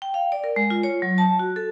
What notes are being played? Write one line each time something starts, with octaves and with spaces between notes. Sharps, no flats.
G5
F5
D5
A#4
G#3
F4
C#5
F#3
A5
F#4
A4